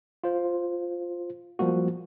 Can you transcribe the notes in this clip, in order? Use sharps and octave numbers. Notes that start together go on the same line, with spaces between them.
F4 C5
F3 G3 A#3 F#4